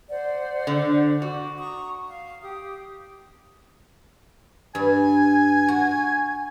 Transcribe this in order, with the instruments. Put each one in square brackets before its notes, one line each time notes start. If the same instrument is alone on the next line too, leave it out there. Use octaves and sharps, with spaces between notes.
[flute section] C5 D5 F#5
[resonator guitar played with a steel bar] D3
[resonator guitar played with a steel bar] F#4 [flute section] D6
[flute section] A#5 C#6 D#6
F5
G4 D#6
[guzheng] G2 [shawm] G#5
[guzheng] F#4